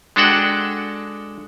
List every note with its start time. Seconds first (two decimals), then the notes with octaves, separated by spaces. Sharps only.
0.16 G#3 D4 F#4 A4 F#5 G5